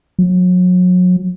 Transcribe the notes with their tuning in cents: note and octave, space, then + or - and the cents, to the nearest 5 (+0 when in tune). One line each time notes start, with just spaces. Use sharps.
F#3 -35